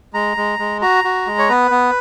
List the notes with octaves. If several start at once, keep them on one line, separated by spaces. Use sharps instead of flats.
G#3 A#5
G#3
G#3
F#4 A#5
F#4
G#3
C#5
B3 B4
B3